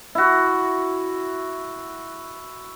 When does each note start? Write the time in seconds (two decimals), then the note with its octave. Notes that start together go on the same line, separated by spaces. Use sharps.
0.15 E4 F#4